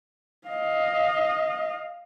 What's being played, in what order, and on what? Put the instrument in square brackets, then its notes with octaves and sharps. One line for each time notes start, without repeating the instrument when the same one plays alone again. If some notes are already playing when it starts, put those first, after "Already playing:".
[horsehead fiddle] D#5 F5